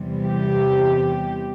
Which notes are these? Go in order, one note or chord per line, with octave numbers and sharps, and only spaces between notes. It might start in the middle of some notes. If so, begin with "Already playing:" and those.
Already playing: E2 C3 E3 G3
G4